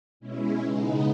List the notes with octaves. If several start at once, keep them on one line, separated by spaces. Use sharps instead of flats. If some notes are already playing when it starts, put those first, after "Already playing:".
B2 G#3 C#4 E4
C#3 G#3 B3 D#4